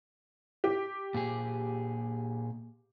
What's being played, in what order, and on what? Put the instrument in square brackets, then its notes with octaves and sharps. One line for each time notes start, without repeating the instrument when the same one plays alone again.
[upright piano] G4
[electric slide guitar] A#2 G#4